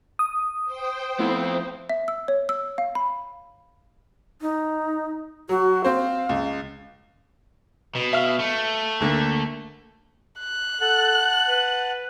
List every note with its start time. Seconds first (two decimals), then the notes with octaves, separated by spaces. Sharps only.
0.19 D#6
0.65 C5 G5
1.19 F3 A3 B3 C4 E4 F4
1.90 E5
2.08 E6
2.28 C#5
2.49 E6
2.78 F5
2.95 B5
4.41 D#4
5.49 F#3 F#4
5.84 C4 C5 F5
6.29 C#2
7.95 B2
8.13 E5 F5 F6
8.40 A3
9.00 D2 D3 A#3
10.39 F#6
10.81 A4 F#5 A5 F#7
11.48 B4